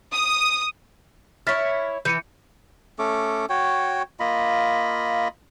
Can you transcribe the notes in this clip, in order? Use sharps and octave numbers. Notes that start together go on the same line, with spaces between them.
D#6
E4 C#5 F6 A6 B6
E3 G6 C#7 D#7
A3 C#4 A4 D6
F#4 C#5 G5
A#3 F4 D#5 B5